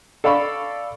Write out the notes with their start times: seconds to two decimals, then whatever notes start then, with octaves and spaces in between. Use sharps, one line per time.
0.24 A4 D5 F5 B5 C#6